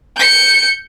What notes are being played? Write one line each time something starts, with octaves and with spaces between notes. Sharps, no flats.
G6 C#7